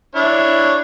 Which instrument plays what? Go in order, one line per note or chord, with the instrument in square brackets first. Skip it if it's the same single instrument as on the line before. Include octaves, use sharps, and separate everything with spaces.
[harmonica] D4 E4 C#5